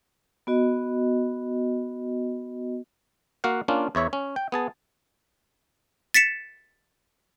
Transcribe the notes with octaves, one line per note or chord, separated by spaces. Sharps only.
B3 F#4 D#5
A#3 F#4 F5 F#5
A#3 C#4 D4 F4
E2 E4 C#5 E5
C#4
G5
B3 G#4 A5
A6 B6 C#7 E7